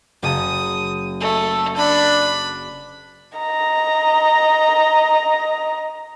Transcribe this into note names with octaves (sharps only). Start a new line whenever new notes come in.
F#1 A5 D#6
A3
D4 B5
D#5 A#5